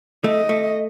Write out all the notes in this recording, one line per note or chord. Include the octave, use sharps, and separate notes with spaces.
A3 D#5
A3